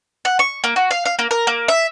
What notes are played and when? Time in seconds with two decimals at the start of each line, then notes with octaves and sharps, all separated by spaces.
0.25 F#5
0.39 C#6
0.64 A#3
0.76 F#4
0.91 F5
1.05 F5
1.19 A#3
1.31 A#4
1.47 A#3
1.68 E5